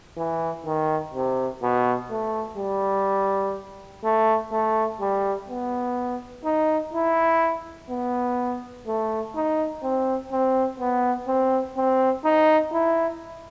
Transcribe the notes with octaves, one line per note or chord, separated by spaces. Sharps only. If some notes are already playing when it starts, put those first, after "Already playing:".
E3
D#3
C3
B2
A3
G3
A3
A3
G3
B3
D#4
E4
B3
A3
D#4
C4
C4
B3
C4
C4
D#4
E4